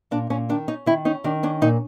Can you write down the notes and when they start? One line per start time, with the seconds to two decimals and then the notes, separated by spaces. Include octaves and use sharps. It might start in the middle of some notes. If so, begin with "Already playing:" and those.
0.11 A#2 D4
0.30 A#2 C#4
0.49 D#3 D4
0.68 C#4 D#4
0.86 D#3 E4
1.05 C#4 D#4
1.24 D#3 D4
1.43 C#4 D4
1.61 A#2 D#4